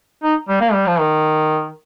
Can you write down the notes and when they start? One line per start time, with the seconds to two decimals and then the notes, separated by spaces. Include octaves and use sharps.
0.23 D#4
0.49 G3
0.61 A#3
0.73 G3
0.87 F3
1.00 D#3